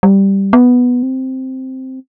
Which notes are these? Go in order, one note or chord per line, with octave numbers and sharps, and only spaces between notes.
G3
B3
C4